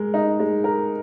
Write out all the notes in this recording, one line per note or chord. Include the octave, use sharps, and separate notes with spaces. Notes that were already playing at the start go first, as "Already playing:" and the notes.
Already playing: G#3 A#4
D#4
G#3
A#4